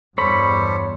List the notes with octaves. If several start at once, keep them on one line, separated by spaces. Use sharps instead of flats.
E2 G2 G3 A4 C5 C#5 B5